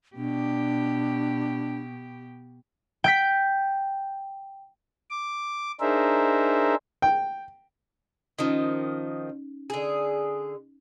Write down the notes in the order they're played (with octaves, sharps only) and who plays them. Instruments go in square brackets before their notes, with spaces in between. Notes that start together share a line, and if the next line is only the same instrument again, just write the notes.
[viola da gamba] B2 G4 [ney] D4
[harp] G5 G6 B6
[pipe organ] D6
D4 D#4 G#4 A#4 C5 E5
[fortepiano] G5
[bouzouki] D#3 F3 [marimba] C#4 D#4
[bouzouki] D3 G#4